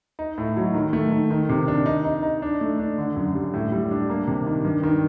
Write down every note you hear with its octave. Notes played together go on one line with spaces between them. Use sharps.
D#4
A2
F#3
D#3
A3
D#3
D#3
C3
D4
D#4
D#4
D#4
D4
A3
D4
D3
F#2
G3
A2
G3
D4
A#3
C3
D#3
G2
D#3